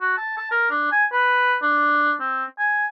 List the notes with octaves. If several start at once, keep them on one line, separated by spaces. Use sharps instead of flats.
F#4
A5
A5
A#4
D4
G#5
B4
D4
C4
G#5